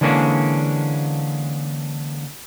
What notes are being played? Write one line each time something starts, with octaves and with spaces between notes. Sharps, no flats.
D3 E3 G#3 A#3 C#4 D4